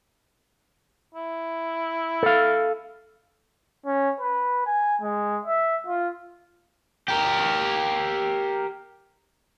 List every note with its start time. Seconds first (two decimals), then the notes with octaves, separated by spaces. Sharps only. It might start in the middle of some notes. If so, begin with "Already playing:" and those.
1.14 E4
2.23 A4 F5
3.86 C#4
4.20 B4
4.66 G#5
5.01 G#3
5.45 E5
5.87 F4
7.08 G4 A#4